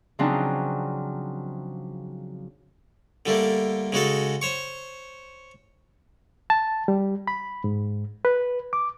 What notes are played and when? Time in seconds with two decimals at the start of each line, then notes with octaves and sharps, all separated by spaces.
0.19 C#3 F3 F#3 C4 D4 D#4
3.26 D3 G3 A3 A#3
3.93 C#3 G#3 F#4 A4
4.42 C5 C#5 C#6
6.50 A5
6.88 G3
7.28 B5
7.64 G#2
8.25 B4
8.73 D6